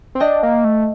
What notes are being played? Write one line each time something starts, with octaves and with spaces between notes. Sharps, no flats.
C4
D4 D#5 G5
A#3
A3